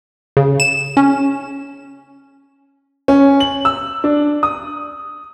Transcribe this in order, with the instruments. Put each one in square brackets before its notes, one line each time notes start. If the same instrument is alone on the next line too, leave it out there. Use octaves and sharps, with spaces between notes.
[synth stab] C#3
E7
C#4
[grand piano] C#4
F#7
E6
D4
D#6